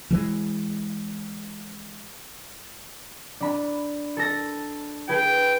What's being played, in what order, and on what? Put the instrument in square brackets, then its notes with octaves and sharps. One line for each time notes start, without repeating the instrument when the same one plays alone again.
[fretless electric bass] E3 G#3
[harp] D4 B5
A4 A#6
[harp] G#4 B4 G#5 [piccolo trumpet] G5